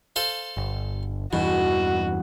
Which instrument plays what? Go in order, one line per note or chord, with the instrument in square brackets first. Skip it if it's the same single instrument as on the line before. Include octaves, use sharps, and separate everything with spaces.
[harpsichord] A4 C5 F5
[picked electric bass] G1
[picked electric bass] E2 G2 E3 [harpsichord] B2 [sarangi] F#4